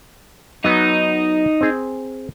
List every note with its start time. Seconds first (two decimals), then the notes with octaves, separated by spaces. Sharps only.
0.65 F#3 B3 D#4 F#5
1.61 C4 G#4